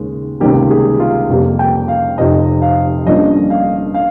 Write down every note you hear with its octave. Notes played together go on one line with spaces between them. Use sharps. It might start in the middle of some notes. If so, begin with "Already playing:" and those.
Already playing: D#2 C#3 G#3
C#2 C3 D#3 G3 A#3 G4
G#4
F4
F2 C3 G3 A#3
G5
F5
F1 F2 C3 F3 C4 D#5
F5
G1 G2 F3 A#3 C#4 D#5
F5
F5